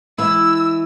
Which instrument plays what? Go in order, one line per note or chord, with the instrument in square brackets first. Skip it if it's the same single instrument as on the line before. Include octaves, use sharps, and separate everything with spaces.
[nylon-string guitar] E3 G#3 E4 [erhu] E6